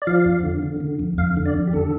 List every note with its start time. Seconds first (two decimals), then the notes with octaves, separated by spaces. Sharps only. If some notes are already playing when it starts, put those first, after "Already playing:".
0.02 D5
0.07 F3 F5
0.25 F2
0.43 D3
0.63 D3
0.80 D3
0.99 F2
1.18 F2 F5
1.37 D3
1.46 D5
1.55 F2
1.67 G4
1.73 D3 A4